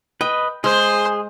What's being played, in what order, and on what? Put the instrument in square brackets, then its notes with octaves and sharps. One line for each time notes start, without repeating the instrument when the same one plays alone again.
[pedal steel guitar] B4 D#5 [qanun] G5
[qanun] G#3 [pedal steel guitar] G#4 [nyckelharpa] C5 C6